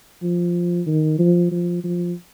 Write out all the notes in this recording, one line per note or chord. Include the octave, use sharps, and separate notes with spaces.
F3
D#3
F3
F3
F3